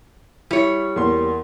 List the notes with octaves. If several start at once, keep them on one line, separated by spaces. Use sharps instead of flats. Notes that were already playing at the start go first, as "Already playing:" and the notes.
G3 E4 C#5
E2 A#3 C6